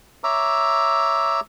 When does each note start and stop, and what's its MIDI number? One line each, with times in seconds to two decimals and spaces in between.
0.24 1.40 73
0.24 1.40 76
0.24 1.40 82
0.24 1.40 86
0.24 1.40 88